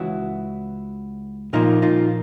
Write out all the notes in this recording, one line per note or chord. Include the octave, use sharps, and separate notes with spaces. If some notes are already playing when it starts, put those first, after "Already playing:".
Already playing: C#2 C#3 E3 E4 F#4
A#2 F3 A#3 D#4 F4
D#4 F4